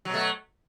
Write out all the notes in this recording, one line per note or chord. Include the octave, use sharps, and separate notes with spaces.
B2 F#3 A3